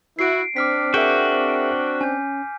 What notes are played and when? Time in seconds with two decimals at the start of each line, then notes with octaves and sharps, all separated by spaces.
0.19 E4 F#4 C7 D7
0.56 C4 D4 D6 F6 B6
0.94 F#4 G#4 A#4 E5 G5
2.01 C#4 G#5 G6